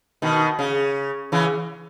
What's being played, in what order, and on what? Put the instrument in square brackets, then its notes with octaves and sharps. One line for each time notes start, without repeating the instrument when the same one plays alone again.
[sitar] B2 D#3
C#3
C#3 E3